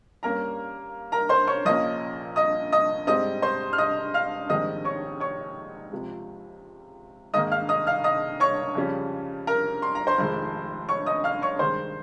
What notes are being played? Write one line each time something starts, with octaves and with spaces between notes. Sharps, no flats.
G2 G3 A#3 C#4 A#4 A#5
A#4 A#5
C5 C6
C#5 C#6
A#1 A#2 F3 A#3 C#4 D#5 D#6
D#5 D#6
D#5 D#6
G#2 G3 C4 D#5 D#6
C5 C6
F6
D#5 D#6
F5 F6
A#1 G#2 D#3 G3 C4 D#5 D#6
C#5 C#6
C#5 C#6
C#2 C3 F3
G#2 D#3 A#3 D#5 D#6
F5 F6
D#5 D#6
F5 F6
D#5 D#6
C#5 C#6
F2 C#3 G3 C#4
A#4 A#5
C6
A#5
C5 C6
F1 F2 D#3 G#3
C#5 C#6
D#5 D#6
F5 F6
C#5 C#6
G2 D#3 G#3 C5 C6